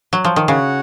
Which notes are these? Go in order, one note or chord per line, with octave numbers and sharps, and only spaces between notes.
F#3
F3
D#3
C#3 F#4 C#5 F#5